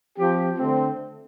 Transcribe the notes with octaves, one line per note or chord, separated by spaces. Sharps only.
F3 C4 G4
D3 A3 C4